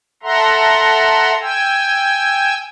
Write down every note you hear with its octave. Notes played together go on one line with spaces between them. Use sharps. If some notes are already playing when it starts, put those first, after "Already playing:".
A4 E5 F#5 A#5 C6
G5 G#5 E6